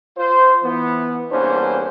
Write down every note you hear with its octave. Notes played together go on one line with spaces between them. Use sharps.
F4 C5
E3 B3
E2 G2 A#3 C#4 D4 C5